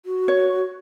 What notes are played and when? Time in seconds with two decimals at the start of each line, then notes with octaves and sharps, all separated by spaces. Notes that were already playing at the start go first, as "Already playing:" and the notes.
0.05 F#4
0.28 C#5